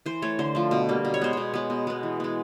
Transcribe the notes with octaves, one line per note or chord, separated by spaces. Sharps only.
E3 C5
A3 C#5
D3 C5
F3 A3
B2
G3 A#3
B2
C#5
G#3 B3 C5
B2 C#5
G#3 B3
B2
G#3 B3
E3
G#3 B3